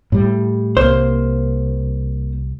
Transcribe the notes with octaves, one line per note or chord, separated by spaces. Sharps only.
A2 G3
C2 A#3 C5